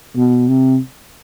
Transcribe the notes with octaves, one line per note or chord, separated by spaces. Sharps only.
B2
C3